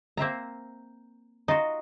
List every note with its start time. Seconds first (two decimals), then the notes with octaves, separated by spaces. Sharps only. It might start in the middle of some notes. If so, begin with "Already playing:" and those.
0.17 A#3 C4 E5 A#5
1.48 D#4 F4 F#4